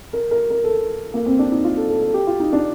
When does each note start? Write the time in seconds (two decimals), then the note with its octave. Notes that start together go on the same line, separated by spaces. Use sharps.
0.13 A#4
0.31 A#4
0.50 A#4
0.64 A4
1.14 A#3
1.26 C4
1.39 D4
1.52 D#4
1.64 F4
1.77 A4
1.90 A4
2.01 A4
2.14 G4
2.27 F4
2.40 D#4
2.53 D4